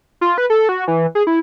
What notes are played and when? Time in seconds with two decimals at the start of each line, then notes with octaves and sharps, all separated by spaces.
0.21 F4
0.38 B4
0.50 A4
0.69 F#4
0.88 E3
1.15 G#4
1.27 E4